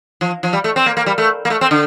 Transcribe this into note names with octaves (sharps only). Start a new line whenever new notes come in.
F3
F3
G3
A3
C4
A#3
A#3
G3
A3
A#3
A3
C4
D3